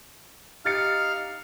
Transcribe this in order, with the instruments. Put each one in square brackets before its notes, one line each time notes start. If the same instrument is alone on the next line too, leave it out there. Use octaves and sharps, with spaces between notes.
[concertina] D#4 F5 F6 [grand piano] G4 A6 C#7